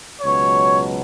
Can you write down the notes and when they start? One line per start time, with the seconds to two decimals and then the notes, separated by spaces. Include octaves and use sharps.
0.22 C#2 B2 F#3 C#5